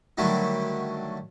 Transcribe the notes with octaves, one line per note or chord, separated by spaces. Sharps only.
D3 D#3 F#3 G3 A3